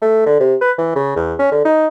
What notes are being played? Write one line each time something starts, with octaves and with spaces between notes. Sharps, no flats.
A3
D3
C3
B4
E3
C#3
E2
C#4
D3
D#4